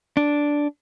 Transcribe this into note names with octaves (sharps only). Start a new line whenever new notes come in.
D4